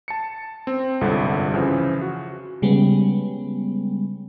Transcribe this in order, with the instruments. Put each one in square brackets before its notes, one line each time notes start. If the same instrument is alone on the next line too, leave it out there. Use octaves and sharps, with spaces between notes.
[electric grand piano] A5 C#7
C4
G1 C2 F2 G#2 D3 G4
C#3 E3 F3
F#4
[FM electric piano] C#3 G3 G#3 B3